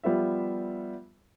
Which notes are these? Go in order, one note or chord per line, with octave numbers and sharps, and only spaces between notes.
F3 G3 B3 F4 E5